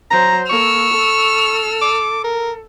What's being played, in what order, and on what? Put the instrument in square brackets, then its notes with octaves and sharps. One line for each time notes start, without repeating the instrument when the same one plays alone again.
[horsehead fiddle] F#3 C5 [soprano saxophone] A#5
[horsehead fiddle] A#3 A4 [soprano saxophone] C#6 [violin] E6 F6
[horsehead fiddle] A4
[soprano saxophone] D6
A#4